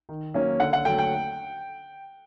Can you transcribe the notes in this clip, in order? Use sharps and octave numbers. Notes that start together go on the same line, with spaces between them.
D#3
F#3 A#3 C#4
D3 F#5
F#5
F#3 A3 G5
G5